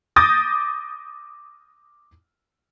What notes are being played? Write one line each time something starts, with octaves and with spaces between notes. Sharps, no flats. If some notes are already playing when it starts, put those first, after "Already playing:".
D6 D#6 G6 A6 A#6